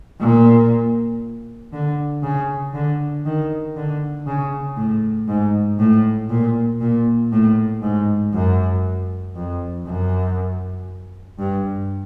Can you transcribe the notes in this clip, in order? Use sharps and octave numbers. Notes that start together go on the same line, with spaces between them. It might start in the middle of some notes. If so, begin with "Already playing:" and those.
A#2
D3
C#3
D3
D#3
D3
C#3
A2
G#2
A2
A#2
A#2
A2
G#2
F#2
F2
F#2
G2